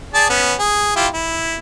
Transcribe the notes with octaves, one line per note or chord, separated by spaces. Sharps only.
G#4 D5 A5
B3 C#4
G#4
E4 F4 G4
E4